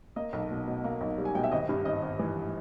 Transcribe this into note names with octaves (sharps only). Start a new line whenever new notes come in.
A#3 D#5
B1
B2
B2
A#3
B1
G3
G#5
B2 G5
E5
G#1 D#5
G2
G#1 D#5
G#1
E3